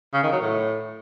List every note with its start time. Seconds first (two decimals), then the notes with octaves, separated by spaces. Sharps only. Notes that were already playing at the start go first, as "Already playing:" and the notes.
0.14 C#3
0.23 D#3
0.32 F#3
0.41 A2